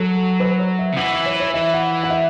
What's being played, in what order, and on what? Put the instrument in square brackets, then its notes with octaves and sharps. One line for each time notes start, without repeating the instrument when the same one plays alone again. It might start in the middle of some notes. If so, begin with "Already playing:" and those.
Already playing: [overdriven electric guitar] F#3 [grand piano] A4
[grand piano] B4
C#5
E5
[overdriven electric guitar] C#3
[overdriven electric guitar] E3 [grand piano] F#5
[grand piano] E5
C#5
C#5
[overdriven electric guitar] E3 [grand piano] E5
[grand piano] F#5
F#5
E5